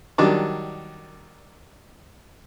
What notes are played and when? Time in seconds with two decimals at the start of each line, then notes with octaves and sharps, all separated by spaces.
0.18 D#3 F#3 G3 D4 D6